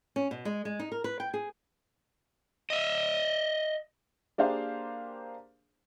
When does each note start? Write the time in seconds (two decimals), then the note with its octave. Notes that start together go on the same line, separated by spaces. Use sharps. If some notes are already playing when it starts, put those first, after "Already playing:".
0.16 C#4
0.31 B2
0.45 G#3
0.65 G#3
0.80 D#4
0.92 A#4
1.04 B4
1.20 G5
1.34 G#4
2.70 D#5 E5
4.38 A#3 D4 G4 G#4 C5 F5